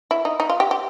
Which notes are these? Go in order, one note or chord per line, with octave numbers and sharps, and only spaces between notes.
E4
D#4
D#4
F4
G4
G4